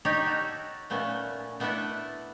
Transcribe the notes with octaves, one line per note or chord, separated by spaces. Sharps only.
D#4 G4 C#5 D5
F#4 A4
A#2 A3 B3 C#4
A3 B3 D4 E4 A4 B4